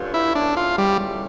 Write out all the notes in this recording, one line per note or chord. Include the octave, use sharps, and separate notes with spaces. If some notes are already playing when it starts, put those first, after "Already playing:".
Already playing: G2 D3 A3 C#4 F4
E4
E2 D3 A3 C#4 D4
F4
G3